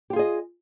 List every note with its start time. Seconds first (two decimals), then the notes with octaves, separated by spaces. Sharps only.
0.10 G4
0.13 F4
0.16 G#4
0.19 D#5